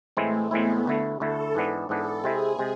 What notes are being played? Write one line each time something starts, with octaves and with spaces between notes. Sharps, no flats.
A2 E3 G#3 A3 C4 E4
A2 E3 G#3 B3 C4 E4
D2 D3 A3 E4
D2 D3 A3 E4 A4
G#2 E3 B3 D4
G#2 E3 B3 D4 A4
C3 G#3 C4 E4 G#4
C3 G#3